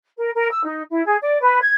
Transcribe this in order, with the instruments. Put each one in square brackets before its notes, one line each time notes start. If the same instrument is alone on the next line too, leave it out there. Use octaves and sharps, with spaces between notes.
[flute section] A#4
A#4
E6
D#4
E4
G#4
D5
B4
G#6